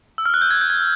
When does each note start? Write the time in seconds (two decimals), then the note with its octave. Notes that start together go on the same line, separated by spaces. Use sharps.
0.18 E6
0.26 F6
0.34 F#6
0.41 G6
0.51 G#6
0.61 G6
0.70 G#6